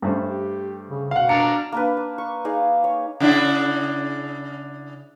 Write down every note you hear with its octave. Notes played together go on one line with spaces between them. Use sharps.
G2 A3 C#4 C5
G4
C#3
B2 F5 F#5
D4 F5 A#5 C#7
A#3 D4 B4
D5
C#6
D#4 G#4 D5 F5
C#5
C#3 D4 E4